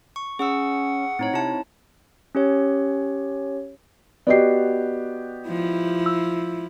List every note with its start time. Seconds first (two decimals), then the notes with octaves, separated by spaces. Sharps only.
0.16 C#6
0.39 C#4 G#4 F#5 C#6 E6
1.19 A2 C4 D#4 C#5
1.33 C3 E4 A5
2.35 C#4 G4 C#5
4.27 B3 F#4 G4 D5 D#5 C7
5.48 F3 E4
6.06 E6